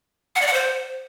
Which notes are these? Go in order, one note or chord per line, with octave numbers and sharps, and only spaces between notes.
F#5
D5
F#5
C5